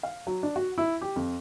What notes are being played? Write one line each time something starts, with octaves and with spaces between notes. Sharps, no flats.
F5
F#3
D4
F#4
E4
G4
F2